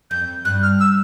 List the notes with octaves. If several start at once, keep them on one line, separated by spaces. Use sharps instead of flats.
F2 G6
G2 F#6
F6
E6